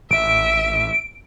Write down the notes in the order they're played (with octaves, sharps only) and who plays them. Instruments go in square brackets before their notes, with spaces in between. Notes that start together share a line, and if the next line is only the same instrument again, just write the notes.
[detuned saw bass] A1 [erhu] E5 [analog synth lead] D7